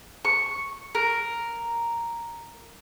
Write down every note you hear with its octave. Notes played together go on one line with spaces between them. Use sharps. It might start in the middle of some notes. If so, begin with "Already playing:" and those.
C#6
A#4